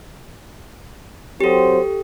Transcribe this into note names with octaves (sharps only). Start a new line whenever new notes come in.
F#3 C4 G4 A4 C5